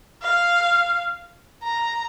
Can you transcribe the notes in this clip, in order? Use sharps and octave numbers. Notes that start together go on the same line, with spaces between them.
F5
A#5